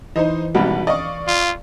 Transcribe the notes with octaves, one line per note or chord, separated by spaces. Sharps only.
E3 D#4 C5 D#5
G#1 B2 G3 F#5
D5 D#5 F5 C#6
F4